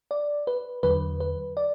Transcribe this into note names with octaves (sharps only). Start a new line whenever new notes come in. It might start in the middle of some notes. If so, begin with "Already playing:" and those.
D5
B4
E2 D3 F#3 B4
B4
D5